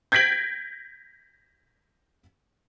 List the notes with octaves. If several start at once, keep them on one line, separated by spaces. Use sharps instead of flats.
G6 G#6 A#6 B6 D7 F#7